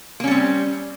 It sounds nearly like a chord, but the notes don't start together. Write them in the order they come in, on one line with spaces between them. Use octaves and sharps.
A#3 C#4 G3 C4